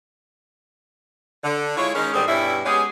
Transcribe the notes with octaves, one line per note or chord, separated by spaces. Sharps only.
D3
G#3 E4 F4 C#5
D#3 G#3 C#4
G2 D3 D#3 G3 C4 G#4
G2 B2 G3 C#4 E4
G#3 B3 C#4 G4 G#4